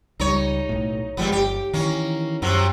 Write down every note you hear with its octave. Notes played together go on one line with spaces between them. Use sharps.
C#2 G3 D#4 C#5
B1 A2
G#1 E2 F3 G3 G#3 B3
G1 G4
D#3 E3 A#3 C#4
F#2 C3 F3 F#3